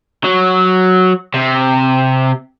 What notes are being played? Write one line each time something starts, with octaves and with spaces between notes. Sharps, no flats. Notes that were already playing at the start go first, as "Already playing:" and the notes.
F#3
C3